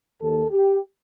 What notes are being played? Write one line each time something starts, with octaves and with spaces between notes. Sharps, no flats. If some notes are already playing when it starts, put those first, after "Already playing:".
D#2 D#3 A4
G4